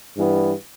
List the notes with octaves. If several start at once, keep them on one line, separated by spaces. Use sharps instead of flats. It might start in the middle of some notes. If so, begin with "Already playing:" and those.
G2 E3 B3